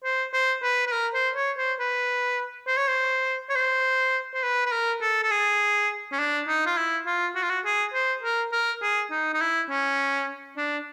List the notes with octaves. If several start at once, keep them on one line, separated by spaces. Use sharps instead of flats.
C5
C5
B4
B4
A#4
C5
C#5
C5
B4
C5
C#5
C5
C#5
C5
C5
B4
B4
A#4
A4
A4
G#4
C#4
D4
D#4
F4
E4
F4
F#4
F4
F#4
G#4
C5
A#4
A#4
G#4
D#4
D#4
E4
C#4
D4